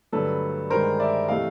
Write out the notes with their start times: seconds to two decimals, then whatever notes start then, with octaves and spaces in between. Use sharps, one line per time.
0.12 G2 D3 F#3 A3 A4 B4
0.70 G2 D#3 G#3 A#4 C5
1.00 D5 E5
1.28 C3 E3 A3 D#5 F5